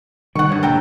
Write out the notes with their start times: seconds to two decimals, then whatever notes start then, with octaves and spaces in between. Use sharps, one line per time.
0.35 C3 D#3 G3 F#5 C#6
0.49 G2 C#5
0.63 A#2 G#3 A4 G5 A#5